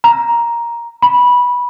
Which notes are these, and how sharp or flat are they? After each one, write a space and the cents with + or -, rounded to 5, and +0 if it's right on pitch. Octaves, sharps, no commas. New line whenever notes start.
A#5 +10
B5 -15